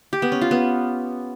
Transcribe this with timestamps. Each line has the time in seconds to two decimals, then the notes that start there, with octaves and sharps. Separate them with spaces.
0.13 G4
0.22 B3
0.32 C#4
0.41 F4
0.51 B3